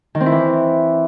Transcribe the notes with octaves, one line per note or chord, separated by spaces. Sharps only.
D#3
C4
E4
E3